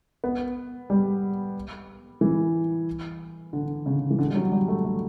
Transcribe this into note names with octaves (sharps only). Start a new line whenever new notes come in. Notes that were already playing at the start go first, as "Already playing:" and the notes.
B3
G3
E3
D3
C#3
E3
D3
G3
F#3
G3
A3
A3